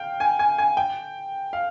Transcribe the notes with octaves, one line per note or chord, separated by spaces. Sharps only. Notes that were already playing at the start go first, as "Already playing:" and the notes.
Already playing: F5 G5
G#5
G#5
G#5
G5
F5